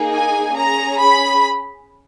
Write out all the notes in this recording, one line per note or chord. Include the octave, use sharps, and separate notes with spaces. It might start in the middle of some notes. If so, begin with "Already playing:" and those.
Already playing: A#3 D#4 G#4
G#5
C#4 G#4 A#5
B5